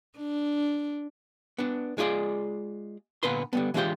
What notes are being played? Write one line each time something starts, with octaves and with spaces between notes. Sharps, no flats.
D4
B3 D4
G#3 F4 G#4 D5
A#2 D3 B3 B4 C6
D3 G3 B3
E3 G#3 D4 F4 G4 C5